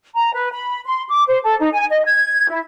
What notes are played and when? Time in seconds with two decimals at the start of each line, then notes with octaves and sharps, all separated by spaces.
0.16 A#5
0.32 B4
0.52 B5
0.85 C6
1.09 D6
1.27 C5
1.43 A4
1.60 D#4
1.73 G#5
1.90 D#5
2.05 G#6
2.50 E4